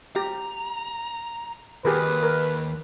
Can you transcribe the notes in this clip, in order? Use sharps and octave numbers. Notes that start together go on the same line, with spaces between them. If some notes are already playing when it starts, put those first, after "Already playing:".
G4 A#5
D#2 G4 G#4 A#4 B4
A#4